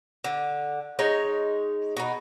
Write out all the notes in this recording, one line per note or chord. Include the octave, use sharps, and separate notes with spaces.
D3
G#3 D#4 C#5
B2 D#4